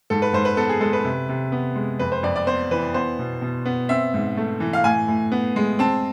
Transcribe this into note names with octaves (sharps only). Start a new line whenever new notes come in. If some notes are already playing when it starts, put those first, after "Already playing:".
G#2 A4
B4
G#2 C5
B4
B3 A4
G#4
G#3 A4
B4
C3
C3
B3
G#3
F2 B4
C5
F2 D5
D5
B3 C5
E3 B4
B3 C5
B2
B2
B3
C4 E5
G#2
A3
E3
F5
A2 G#5
A2
B3
G#3
C4 A5